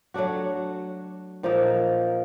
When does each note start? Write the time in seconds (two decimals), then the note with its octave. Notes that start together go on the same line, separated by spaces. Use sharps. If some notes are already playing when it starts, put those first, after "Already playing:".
0.14 F#3 A3 D4 F#4
1.43 A#2 F3 A#3 D#4